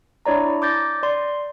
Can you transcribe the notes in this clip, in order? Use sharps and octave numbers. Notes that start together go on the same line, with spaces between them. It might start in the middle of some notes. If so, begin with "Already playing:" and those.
D4 E4 C#5 D5 A#5
D6 G6 A6 A#6
D5 C6